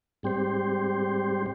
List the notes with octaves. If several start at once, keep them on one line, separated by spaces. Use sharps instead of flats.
G#2 G3 C4 G4 C5